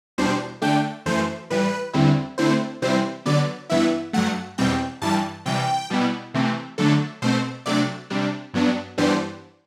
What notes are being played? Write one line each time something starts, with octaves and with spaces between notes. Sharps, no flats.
E2 B2 G3 D4 C5
D3 A3 D4 G5
F#2 E3 A3 C5
A2 E3 G3 B4
E2 D3 G3 C4 E4
D3 A3 C4 E4 C5
C3 E3 G3 C4 E4 C5
D3 F#3 B3 D5
G2 E3 B3 E4 E5
G2 F#3 A3 F#5
E2 B2 G3 C4 G5
G2 E3 G3 A5
C3 E3 G3 G5
B2 G3 B3 E4
C3 E3 A3 C4
D3 F#3 A3 D4 A4
B2 A3 C4 C5
C3 F#3 A3 D4 D5
C3 G3 D4
G2 F#3 B3 D4
G2 E3 G3 B3 D4 C5